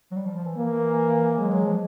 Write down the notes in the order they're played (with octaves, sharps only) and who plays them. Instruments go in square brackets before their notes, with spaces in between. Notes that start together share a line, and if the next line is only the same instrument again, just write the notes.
[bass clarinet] F#3
G3
F3
F3
E3
[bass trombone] A#3
[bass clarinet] F#3 [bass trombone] G#3
[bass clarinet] F#3
F3